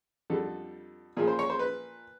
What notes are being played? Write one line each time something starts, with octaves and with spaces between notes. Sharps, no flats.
F2 D3 G3 A4
A#2 F3 G#4
C5
C#5
C5
B4